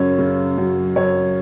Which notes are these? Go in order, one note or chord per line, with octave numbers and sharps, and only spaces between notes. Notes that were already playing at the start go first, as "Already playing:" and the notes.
Already playing: F#2 C#3 C#5
C#3
F#2
F#2 C#5